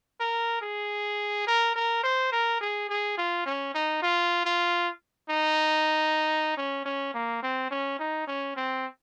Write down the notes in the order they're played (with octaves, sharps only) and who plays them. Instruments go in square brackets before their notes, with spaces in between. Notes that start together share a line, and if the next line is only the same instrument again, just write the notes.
[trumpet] A#4
G#4
A#4
A#4
C5
A#4
G#4
G#4
F4
C#4
D#4
F4
F4
D#4
C#4
C#4
A#3
C4
C#4
D#4
C#4
C4